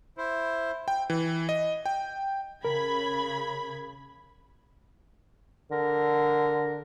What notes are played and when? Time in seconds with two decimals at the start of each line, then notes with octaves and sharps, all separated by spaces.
0.18 E4 C5
0.88 G5
1.10 E3
1.49 D#5
1.86 G5
2.65 C#3 A#4 B5 G#6
5.72 D3 A#4